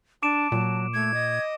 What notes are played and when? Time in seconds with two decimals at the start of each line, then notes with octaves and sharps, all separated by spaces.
0.23 D4 A5 D6 D7 E7
0.52 A#2 F#3
0.94 A3 G#6
1.14 D#5